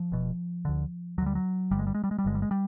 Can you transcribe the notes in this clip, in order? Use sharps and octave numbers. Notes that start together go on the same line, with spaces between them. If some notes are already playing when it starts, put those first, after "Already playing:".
Already playing: F3
E1 E2 B2
D2 D3
D2 D3 F#3 G3
F#3
G1 G2 D3 G3
G#3
G3
G#3
G3
G#3
G3
G1 G2 D3 G#3
G3
G#3
G3